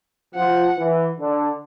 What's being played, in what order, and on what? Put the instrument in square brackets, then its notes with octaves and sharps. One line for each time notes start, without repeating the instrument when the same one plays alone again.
[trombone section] F3 [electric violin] F#5
[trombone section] E3
D3